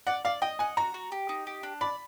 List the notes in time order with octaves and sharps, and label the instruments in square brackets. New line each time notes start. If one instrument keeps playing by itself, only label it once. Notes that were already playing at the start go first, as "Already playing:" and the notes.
[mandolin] D5 [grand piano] F#5
[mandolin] D5 [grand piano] F5
[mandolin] D#5 [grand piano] G5
[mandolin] F#5 [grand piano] G#5
[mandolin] F#4 [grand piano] A#5
[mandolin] F#4
G4
D#4
G4
D4
[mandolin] D5 [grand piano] B5